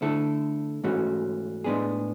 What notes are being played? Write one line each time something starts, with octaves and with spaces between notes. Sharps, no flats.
D3 A3 E4 A4
G#2 E3 A3 C#4 F#4
A2 G#3 B3 D4 G#4